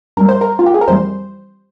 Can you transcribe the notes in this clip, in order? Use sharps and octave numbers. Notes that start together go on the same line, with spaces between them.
G2 G3 A#4
C5
A#4
F4
G4
G#4
A#4
F2 E3 G3 C5